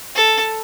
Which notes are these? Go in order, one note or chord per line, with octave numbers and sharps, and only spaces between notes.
A4